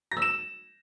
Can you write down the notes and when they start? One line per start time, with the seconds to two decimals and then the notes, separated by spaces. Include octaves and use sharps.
0.11 A#6
0.17 E6
0.22 E7